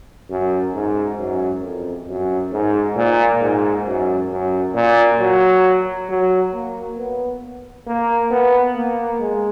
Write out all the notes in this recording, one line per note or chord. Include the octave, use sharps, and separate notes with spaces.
F#2
G#2
F#2
F2
F#2
G#2
A#2
G#2
F#2
F#2
A#2
F#3
F#3
A#3
B3
A#3
B3
A#3
G#3